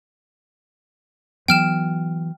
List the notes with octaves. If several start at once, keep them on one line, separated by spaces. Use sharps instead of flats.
E3 F#3 B3 G5 F6 E7